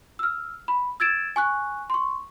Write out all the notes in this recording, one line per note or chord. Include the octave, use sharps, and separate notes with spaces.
E6 F6
B5
E6 G#6 A6 D7 E7
G#5 C#6 F#6
C6 C#6